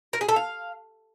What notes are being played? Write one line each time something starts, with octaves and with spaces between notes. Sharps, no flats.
A#4
G#4
A4
F5